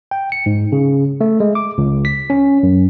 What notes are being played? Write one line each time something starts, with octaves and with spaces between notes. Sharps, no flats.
G5
C#7
G#2
C#3
A3
G#3
D6
C#2
B6
C#4
F#2